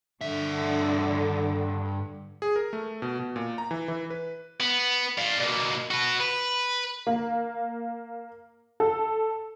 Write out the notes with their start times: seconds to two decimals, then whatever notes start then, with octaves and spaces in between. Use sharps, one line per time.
0.21 G2 D3 E5
2.42 G#4
2.56 A#4
2.73 A3
3.02 B2
3.19 B2
3.36 A#2
3.58 A#5
3.71 E3
3.88 E3
4.10 B4
4.60 B3
5.18 D5 F5
5.40 B2 A#3
5.91 F#4 B4
6.20 B4
7.07 A#3
8.80 A4